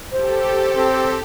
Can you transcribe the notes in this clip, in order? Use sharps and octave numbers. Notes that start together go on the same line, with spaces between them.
G4 A4 C5
C4